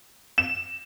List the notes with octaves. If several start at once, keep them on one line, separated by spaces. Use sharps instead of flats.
E7